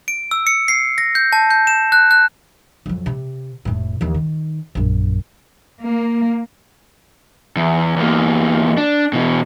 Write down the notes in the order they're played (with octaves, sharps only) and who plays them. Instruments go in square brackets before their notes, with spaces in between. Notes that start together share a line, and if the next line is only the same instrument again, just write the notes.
[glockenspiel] D7
E6
C#7
C7
A#6
G6
A5
G6
E7
F#6
F#6
[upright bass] F2 F#3
C3
F1 A2
D#2 E3
D#3
A#1 F#2
[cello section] A#3
[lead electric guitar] E2
E2 A#3
D4
B2 E3